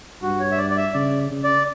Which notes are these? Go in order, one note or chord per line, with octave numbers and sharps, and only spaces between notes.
G2 F#4
C#5
E5
D5
D5
E5
C#3 D5
C#3
D5